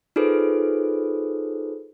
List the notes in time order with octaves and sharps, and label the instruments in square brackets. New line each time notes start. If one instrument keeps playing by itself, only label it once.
[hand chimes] D#4 F4 G#4 A4 B4 C5